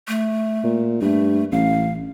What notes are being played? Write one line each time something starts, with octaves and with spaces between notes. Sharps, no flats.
A3
A#2
G2 A3
A1 F5